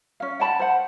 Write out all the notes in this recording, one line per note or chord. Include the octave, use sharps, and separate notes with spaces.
C#4 F5
F#5 G5 A5 B5
C5 F#5